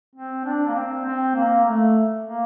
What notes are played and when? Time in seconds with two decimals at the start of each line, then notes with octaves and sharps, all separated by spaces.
0.15 C4
0.45 D4
0.67 A#3
0.75 C4
1.05 C4
1.35 A#3
1.65 A3
2.26 A#3